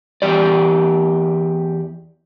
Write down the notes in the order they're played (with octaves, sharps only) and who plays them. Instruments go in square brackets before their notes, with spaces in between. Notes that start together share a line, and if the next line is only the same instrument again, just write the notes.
[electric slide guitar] E2 G4 D5